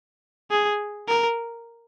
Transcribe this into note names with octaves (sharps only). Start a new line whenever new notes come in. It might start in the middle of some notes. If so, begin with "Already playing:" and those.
G#4
A#4